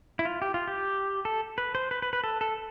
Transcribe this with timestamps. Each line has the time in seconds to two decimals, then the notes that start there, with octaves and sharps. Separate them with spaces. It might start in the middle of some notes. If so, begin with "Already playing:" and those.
0.19 E4
0.25 F4
0.42 G4
0.54 F4
0.68 G4
1.25 A4
1.58 B4
1.75 C5
1.91 B4
2.02 B4
2.13 B4
2.24 A4
2.41 A4